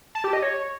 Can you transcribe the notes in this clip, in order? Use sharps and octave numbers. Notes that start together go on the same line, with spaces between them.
A5
G4
D#5
C#5